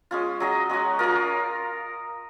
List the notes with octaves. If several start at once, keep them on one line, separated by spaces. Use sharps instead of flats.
G#3 C#4 F4
F#3 C#4 G#4 D#5
G#3 C#4 F#4
C#4 F4 A#4